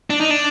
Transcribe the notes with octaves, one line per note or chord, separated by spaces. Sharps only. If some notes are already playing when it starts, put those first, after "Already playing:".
D4
D#4
D4